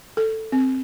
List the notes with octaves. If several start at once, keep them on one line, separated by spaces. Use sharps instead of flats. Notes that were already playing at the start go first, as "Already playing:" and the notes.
A4
C4